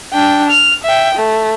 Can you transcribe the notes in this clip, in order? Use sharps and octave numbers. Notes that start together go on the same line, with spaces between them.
D4 G5
F6
E5 G5
A3